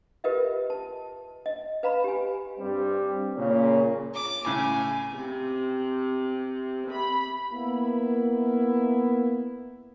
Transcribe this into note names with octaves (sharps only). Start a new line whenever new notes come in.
F4 G4 A#4 B4 D#5 E5
A5
D#5
B4 F5 A#5 B5
G4 G#5
G2 G3 C4
A#2 C#3
D6
A2 C#3 G#5
C3
B5
A#3 B3 E4